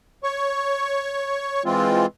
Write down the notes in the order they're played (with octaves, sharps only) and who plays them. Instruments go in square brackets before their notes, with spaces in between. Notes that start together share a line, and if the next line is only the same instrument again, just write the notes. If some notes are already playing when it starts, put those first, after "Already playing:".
[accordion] C#5 C#6
E3 G#3 C4 F4